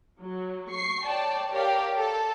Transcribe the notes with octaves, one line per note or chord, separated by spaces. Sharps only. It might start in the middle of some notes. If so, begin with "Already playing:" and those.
F#3
C#6 C7
C#5 D5 G5 A5
G4 A#4 C#5 D5 F5
A4 A5